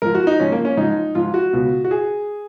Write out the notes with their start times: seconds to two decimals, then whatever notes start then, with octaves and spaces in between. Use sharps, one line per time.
0.02 G#2 F3 A#4
0.15 F#4
0.27 D#4
0.40 G#2 F3 C#4
0.52 A#3
0.65 C#4
0.77 G#2 F3 D#4
1.15 G#2 F3 F4
1.34 F#4
1.53 C#2 B2
1.84 F#4
1.91 G#4